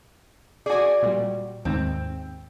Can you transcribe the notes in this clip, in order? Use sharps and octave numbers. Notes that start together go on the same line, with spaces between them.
F#4 G#4 D5 G#5
A#2 G3
D#2 G#2 C4